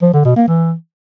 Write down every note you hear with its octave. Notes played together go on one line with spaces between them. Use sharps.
F3
D3
B2
A#3
E3